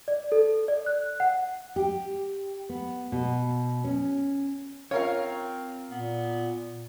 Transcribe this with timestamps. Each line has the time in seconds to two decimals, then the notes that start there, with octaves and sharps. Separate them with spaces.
0.08 D5
0.32 A4
0.68 D5
0.86 F#6
1.20 F#5
1.76 G4
2.69 B3
3.12 B2
3.85 C#4
4.91 C4 F4 A#4 C#5 F5
5.91 A#2 B3